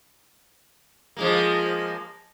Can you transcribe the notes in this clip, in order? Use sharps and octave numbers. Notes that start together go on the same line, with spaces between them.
F3 G#3 A#3